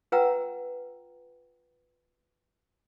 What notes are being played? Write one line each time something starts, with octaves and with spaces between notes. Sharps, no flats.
F4 B4 F#5 G5 A#5 E6